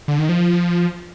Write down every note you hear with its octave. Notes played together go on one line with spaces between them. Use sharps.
D3
D#3
F3